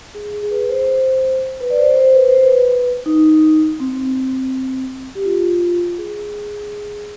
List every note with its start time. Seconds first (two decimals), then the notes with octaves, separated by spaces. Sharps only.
0.15 G#4
0.32 G#4
0.43 G#4
0.51 B4
0.69 C5
1.60 B4
1.70 D5
1.78 C5
1.97 C5
2.14 B4
2.29 C5
2.43 B4
3.06 D#4
3.80 C4
5.15 G4
5.25 F4
5.98 G#4